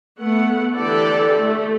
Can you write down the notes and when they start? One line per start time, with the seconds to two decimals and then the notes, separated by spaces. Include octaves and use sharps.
0.19 A3 B3 F#5
0.76 D3 E3 G4 A4 D5
1.38 A3